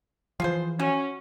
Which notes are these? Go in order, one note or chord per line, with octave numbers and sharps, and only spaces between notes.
E3 F3 F4 G#4 C5
C#4 F#4